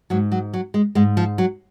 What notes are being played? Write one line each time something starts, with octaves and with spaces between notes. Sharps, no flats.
G#2 F#3
F#3
F#3
G#3
G#2 G#3
F3
F#3